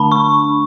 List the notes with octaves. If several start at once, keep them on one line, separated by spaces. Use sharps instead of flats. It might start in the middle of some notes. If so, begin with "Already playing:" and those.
Already playing: D3 A3 D4 A5 B5
C#6